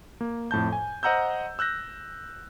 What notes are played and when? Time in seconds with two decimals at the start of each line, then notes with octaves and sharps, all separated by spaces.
0.21 A#3
0.51 F2 A2 A5 G6
0.73 G#5
1.03 C5 D#5 F#5 A#5 E6 G6
1.59 E6 F#6 G6 A#6